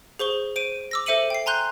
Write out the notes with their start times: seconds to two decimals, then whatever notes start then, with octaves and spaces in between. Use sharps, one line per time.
0.19 G#4 C5 C#6 G7
0.56 C5 D7 D#7
0.91 D6 E6 A#6
1.06 A4 C5 E5 C#7 D#7 F#7
1.30 G5 C7
1.46 G#5 A#5 C6 F#6 G6